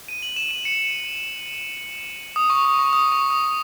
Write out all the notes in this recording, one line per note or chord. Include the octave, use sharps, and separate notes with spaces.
D#7
F#7
E7
D#7
C#7
D#6
C#6
D#6
C#6
D#6
C#6
D#6